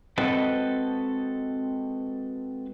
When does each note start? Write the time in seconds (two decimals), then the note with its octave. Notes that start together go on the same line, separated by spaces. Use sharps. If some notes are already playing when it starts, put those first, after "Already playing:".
0.18 G#3 C4 F#4 A4 B4 D#5